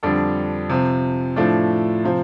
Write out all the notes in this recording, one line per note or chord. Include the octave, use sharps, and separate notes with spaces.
F2 D3 G3 D4 A4
C3 F3 C4
A2 F3 A3 D4
C3 F3 C4